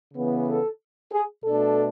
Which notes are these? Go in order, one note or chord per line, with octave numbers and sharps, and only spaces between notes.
C#3 E3 B3
A4
G#4
B2 A3 D4 A4